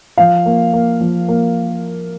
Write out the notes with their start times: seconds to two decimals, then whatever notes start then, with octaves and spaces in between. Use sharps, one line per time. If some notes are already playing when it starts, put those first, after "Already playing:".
0.18 F3 F5
0.46 A#3
0.73 A#3
1.01 F3
1.28 A#3